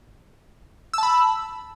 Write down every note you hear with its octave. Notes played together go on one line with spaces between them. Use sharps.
A5 B5 E6